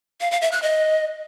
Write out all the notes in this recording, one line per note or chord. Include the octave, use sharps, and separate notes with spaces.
F5
F5
E5
F#6
D#5